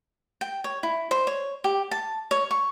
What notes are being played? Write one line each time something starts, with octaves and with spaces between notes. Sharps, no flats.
G5
C#5
E4
C5
C#5
G4
A5
C#5
C#6